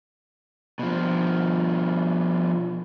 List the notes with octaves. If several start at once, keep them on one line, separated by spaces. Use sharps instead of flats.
B2 F3